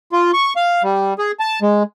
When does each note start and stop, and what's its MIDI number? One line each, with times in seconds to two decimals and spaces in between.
0.12 0.31 65
0.34 0.53 85
0.56 0.83 77
0.83 1.14 55
1.19 1.32 68
1.40 1.60 81
1.62 1.83 56